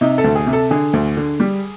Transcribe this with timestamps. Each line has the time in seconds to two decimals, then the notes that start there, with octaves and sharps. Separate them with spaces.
0.01 C3 D#4
0.18 A4
0.24 D2
0.35 G#4
0.47 C3
0.53 A4
0.71 D3 G#4
0.93 D2
1.17 D3
1.40 G3